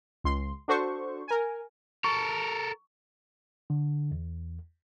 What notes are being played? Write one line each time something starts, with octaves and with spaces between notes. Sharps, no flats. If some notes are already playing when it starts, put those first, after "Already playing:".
C#2 C6
D4 F#4 A4 C5 C#6
A#4 G#5
A4 A#4 C#6
D3
E2